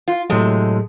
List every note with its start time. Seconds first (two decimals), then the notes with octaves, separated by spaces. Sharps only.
0.08 F4
0.30 A2 C3 F#3 G#3 A3